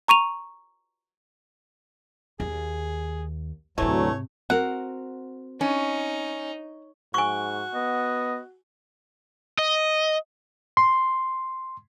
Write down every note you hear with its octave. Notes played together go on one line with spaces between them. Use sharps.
A#5 C#6 D#7 F7
D#2 G#4
D2 G#2 C3 E3 F#3 A3 C#5
C4 F#4 A#4 F#5
C#4 D#4
G#2 F#4 G#5 C#6
B3 D#5
D#5
C6